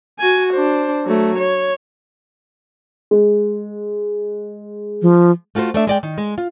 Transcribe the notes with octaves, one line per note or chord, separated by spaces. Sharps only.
F#4 G#5
D4 C5
F#3 A3
C#5
G#3
F3
A3 F4 F#4 A4 C5
A3 D4 E5
G#3 D5 G5
D#3
G#3
F4